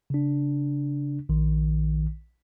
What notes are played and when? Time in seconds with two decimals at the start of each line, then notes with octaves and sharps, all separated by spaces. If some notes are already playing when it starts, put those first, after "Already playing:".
0.10 C#3 D4
1.29 A#1 D#3